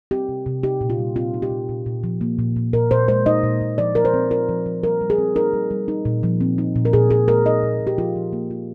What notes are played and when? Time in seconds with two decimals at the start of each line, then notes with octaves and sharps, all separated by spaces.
0.11 C4 G4
0.29 C3
0.46 C3
0.63 D#4 G4
0.81 A#2
0.90 F4
0.98 G3
1.16 C4 F4
1.34 D#4
1.42 G4
1.51 A#2
1.69 A#2
1.86 A#2
2.04 F3
2.21 A#3
2.39 A#2
2.56 A#2
2.73 A#2 A#4
2.91 A#2 C5
3.08 G#3 C5
3.26 D#4 D#5
3.43 A#2
3.61 A#2
3.78 F3 D5
3.95 F3 A#4
4.05 C5
4.14 C4
4.31 F4 A#4
4.49 F3
4.66 F3
4.83 G3 A#4
5.01 G3
5.10 G#4
5.18 C4
5.36 D#4 A#4
5.53 G3
5.71 G3
5.88 D#4
6.05 A#2
6.23 F3
6.41 C4
6.58 D#4
6.76 A#2
6.85 A#4
6.93 A#2 G#4
7.11 A#2 G#4
7.28 G#3 A#4
7.46 D#4 D#5
7.63 A#2
7.80 A#2
7.87 G4
7.98 F3 F4
8.16 F3
8.33 A#3
8.51 F4